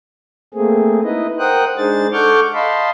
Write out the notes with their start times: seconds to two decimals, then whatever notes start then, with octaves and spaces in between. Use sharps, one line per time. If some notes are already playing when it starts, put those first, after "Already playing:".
0.54 A3 A#3 C4 G#4
1.04 D#4 E4 B4 D#5
1.39 A#4 C5 F#5 G5 D#6 F#6
1.78 G#3 D4 D#4 G#4 C5 A6
2.13 A4 F#5 C#6 D6 F6 G6
2.54 D#5 F5 A5 B5 C6